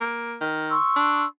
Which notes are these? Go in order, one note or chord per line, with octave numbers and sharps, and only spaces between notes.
A#3
D#3
C6 C#6 E6
D4